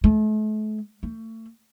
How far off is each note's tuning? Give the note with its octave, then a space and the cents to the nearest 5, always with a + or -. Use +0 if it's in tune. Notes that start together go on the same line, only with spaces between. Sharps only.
A3 -40
A3 +30